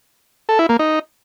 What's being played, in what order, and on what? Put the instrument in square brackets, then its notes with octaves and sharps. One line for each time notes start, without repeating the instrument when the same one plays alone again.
[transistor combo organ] A4
E4
A#3
D#4